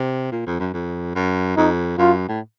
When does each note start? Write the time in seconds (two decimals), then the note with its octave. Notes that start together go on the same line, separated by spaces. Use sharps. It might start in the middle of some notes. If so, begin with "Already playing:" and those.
Already playing: C3
0.32 A#2
0.47 F2
0.60 F#2
0.73 F2
1.15 F#2
1.57 F2 D#4
1.98 F#2 F4
2.29 A2